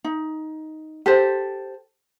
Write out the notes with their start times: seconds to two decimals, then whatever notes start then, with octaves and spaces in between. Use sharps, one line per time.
0.04 D#4
1.06 G4 A4 C5